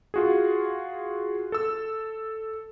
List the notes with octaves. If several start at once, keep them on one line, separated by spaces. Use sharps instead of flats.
F4 F#4 G#4
A4 E6